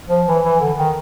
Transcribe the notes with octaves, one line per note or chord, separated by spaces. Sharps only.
F3
E3
E3
D3
D#3